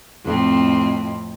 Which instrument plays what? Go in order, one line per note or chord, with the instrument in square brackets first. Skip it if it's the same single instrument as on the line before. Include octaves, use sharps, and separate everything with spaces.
[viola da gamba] F2 A2 C4